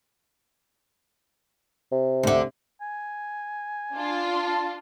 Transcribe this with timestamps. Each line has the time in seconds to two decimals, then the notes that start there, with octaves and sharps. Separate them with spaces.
1.92 C3
2.23 D2 D3
2.81 G#5
3.92 D4 F4
4.47 A5